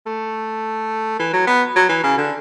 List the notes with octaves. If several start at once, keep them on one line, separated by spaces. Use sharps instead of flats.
A3
E3
F#3
B3
F#3
E3
C#3
D3